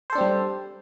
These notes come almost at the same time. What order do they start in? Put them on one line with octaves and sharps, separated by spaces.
C5 A4 D4 C4 G3